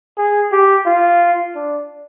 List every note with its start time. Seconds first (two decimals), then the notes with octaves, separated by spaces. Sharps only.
0.17 G#4
0.52 G4
0.86 F4
1.55 D4